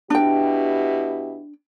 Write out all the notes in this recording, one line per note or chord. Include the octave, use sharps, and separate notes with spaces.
B2 D4 E4 G4 G5